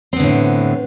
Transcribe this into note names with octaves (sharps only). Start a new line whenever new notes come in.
A2 D3 B3 C4